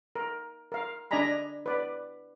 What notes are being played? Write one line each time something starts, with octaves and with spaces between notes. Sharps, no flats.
A#4
A#4 F5
D4 D5 D#5 G#5 A#5 B5
B4 D5